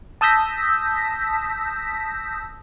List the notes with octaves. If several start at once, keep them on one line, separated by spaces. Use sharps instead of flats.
A5 D#6 E6 G6 A#6 B6